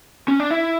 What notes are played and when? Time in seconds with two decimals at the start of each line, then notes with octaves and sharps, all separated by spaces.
0.28 C#4
0.40 D4
0.50 E4